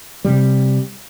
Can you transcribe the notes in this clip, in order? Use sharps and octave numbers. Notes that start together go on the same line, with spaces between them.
C3 G3